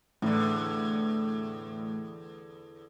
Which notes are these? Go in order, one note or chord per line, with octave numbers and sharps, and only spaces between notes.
E2 A2 D3